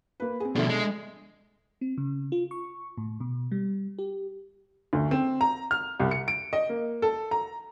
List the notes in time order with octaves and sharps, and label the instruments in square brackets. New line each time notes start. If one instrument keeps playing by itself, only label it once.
[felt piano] A#3 B4
C4 G#4
[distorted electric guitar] B2 F3 [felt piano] D4 A4 E5
[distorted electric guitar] G#3
[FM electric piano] C4
C#3
F4
C#6
A2
B2
G3
G4
[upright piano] D2
C4
A#5
F6
C2
C#7
D7
D#5
A#3
A4
A#5